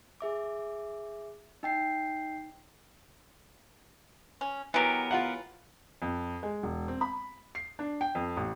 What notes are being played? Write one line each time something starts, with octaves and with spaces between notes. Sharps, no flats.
G#4 E5 D6
D#4 G5 C7
C#4
E3 F#3 B3 G4 A#4
F4 F5 F#5
F2
G#3
E1
C4
B5
C7
D4
G5
F2
A1